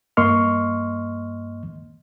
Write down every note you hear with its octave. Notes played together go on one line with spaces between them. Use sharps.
G2 A#3 D#5 C6 C#6 F6